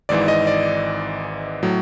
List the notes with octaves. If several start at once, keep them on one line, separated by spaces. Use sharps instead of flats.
G#1 G#2 E3 D5
D#5
D5
A2 F#3